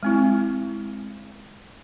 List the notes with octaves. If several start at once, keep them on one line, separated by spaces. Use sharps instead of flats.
G#3 C4 E4